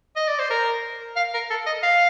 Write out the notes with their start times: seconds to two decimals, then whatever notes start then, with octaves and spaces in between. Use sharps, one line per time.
0.16 D#5
0.28 D5
0.39 C5
0.50 A#4
1.17 F5
1.34 A#4
1.50 A4
1.66 D#5
1.83 F5